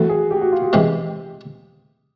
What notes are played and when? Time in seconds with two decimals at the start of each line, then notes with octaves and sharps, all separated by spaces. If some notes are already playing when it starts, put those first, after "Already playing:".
Already playing: E3 A3 C4 E4 F#4 A4
0.09 G#4
0.31 G4
0.41 F#4
0.52 F4
0.62 G4
0.73 C3 E3 G#3 C4